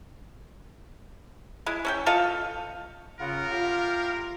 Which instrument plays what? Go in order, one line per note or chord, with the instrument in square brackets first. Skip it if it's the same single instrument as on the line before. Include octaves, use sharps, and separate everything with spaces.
[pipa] G#3 E4
C#4 A4 G5
F4 A4 D#5 F5
[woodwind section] C#3 [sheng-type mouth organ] F4 F#5 [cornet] A#4
[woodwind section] A2 F4 [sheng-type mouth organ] G4 F5 G5